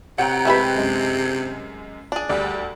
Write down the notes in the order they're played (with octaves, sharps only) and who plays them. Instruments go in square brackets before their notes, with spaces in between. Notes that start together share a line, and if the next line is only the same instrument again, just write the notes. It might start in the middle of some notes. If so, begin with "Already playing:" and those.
[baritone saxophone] C3 [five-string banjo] F#3 [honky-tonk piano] F#5 G5 A#5
[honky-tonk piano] G#3 G4 B4 [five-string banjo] A3 E4 B5
[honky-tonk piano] F#2 G#3
[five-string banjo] D4 G#4
[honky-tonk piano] D2 D5 [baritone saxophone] G3